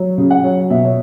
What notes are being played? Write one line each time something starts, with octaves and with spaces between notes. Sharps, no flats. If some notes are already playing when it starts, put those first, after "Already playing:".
Already playing: F#3
C#3
F#5
F#3
B2 E5
C#5